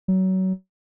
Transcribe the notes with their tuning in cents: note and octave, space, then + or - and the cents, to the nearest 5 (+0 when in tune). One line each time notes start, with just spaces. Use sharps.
F#3 +25